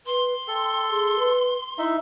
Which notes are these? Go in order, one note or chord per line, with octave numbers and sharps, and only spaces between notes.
B4 C6
A4 G5
G#4
B4
D#4 E4 E5